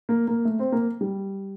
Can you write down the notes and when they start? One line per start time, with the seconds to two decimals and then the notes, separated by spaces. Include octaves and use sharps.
0.09 A#3
0.28 A#3
0.45 A3
0.59 C4
0.72 A#3
1.01 G3